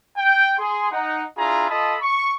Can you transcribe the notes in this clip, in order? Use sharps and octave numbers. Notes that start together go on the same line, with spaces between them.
G5
G#4 C6
D#4 F#5
D4 E4 F4 G#4 A#5
F4 A4 D#5 A5 B5 D#6
C#6